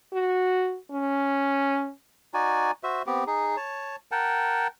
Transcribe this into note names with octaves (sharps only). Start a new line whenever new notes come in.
F#4
C#4
D#4 F#4 D5 G#5
F#4 C5 E5
B3 C4 G4
D#4 G#4
C#5 A5
A#4 F#5 G5 A5